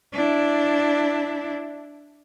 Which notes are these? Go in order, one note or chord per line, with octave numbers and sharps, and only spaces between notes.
D4 E4